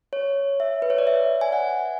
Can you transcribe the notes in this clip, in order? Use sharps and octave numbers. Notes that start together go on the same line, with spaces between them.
C#5
E5
B4
C#5
D5
E5
G#5
F#5